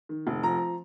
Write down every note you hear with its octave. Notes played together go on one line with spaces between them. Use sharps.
D#3
F1
F3 A#5